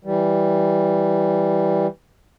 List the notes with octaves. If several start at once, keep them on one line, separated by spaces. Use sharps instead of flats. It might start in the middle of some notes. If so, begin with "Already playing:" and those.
E3 G3